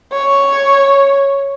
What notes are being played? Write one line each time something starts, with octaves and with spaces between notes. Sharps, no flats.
C#5